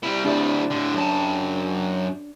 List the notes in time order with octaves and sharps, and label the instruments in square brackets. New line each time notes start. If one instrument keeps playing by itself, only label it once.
[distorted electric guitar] G3 E4
[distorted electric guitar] D2 E4 [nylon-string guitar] D4 G4 E5
[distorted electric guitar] A2 D3
F#2 A5